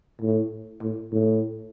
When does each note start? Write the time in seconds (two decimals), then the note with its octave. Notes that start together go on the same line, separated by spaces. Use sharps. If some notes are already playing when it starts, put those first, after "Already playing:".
0.21 A2
0.81 A2
1.12 A2